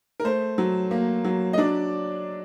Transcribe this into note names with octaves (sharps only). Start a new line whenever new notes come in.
A#4
A3 C5
F#3
A#3
F#3
D#5
F#3 D4 D5